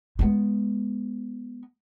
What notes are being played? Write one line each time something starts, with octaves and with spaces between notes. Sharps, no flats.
G#3 B3